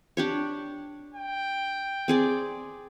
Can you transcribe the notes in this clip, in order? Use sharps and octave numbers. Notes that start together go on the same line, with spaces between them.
D4 G4 C#5
G5
C4 G#4 D5